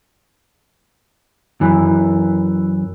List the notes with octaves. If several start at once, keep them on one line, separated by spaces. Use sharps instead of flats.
F#2 E3